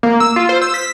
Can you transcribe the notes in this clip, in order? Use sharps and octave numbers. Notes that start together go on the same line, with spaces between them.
A#3
E6
F4
C5
E6
B6